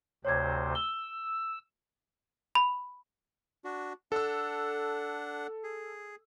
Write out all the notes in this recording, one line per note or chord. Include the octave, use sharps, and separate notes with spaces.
D2 C3 C5 C#5 G#6
E6 G7
B5
D4 F#4
D4 A4 F#5 E6
G#4